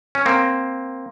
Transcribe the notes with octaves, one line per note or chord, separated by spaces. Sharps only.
C#4
A#3 C4